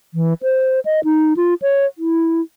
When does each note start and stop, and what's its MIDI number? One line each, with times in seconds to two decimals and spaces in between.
0.14 0.33 52
0.43 0.80 72
0.85 1.00 75
1.04 1.33 63
1.37 1.54 65
1.62 1.85 73
1.98 2.41 64